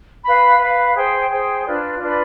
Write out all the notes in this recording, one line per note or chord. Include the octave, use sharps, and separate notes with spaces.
B4 F5 B5
B4 F5 B5
G#4 C5 G5
G#4 C5 G5
D4 F4 B4 D5
D4 F4 B4 D5